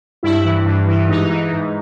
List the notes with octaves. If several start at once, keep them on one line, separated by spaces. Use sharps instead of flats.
G2 E4
E3
G2
E3
G#2 D#4
E3
G#2